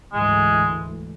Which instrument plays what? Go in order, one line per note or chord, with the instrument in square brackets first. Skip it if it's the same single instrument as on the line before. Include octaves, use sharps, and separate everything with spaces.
[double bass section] D2 G#2 E3 [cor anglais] G#3